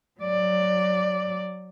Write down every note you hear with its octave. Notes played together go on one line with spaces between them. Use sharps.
F#3 D5